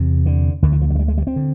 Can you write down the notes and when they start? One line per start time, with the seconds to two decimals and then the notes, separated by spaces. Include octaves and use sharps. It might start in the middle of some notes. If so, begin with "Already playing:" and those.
Already playing: E2 C3
0.26 D3
0.62 D2 D3 D#3
0.72 E3
0.81 F3
0.90 F#3
0.95 G#3
0.99 G3
1.08 G#3
1.18 G3
1.27 C4
1.36 D3